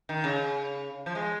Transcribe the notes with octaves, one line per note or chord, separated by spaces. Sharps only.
D#3
C#3
F3
G#3